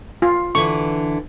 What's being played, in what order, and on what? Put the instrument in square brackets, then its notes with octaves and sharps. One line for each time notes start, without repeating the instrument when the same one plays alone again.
[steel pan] F4
[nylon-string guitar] D3 E3 [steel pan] C#6